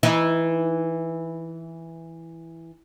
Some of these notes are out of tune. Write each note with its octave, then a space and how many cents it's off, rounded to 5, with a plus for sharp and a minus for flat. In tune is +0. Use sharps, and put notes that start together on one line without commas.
E3 +0 D#4 +20